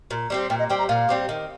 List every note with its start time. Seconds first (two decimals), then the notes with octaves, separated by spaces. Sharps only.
0.11 A#2
0.30 G3 C4 G4
0.50 A#2 G5
0.59 D#5
0.70 G3 C4 G4 G5
0.79 A#5
0.89 A#2 F5
1.09 G3 C4 G4
1.29 D#3